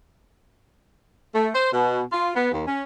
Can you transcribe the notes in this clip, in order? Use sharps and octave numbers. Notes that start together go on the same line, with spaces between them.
A3
C5
B2
F4
B3
D#2
C#4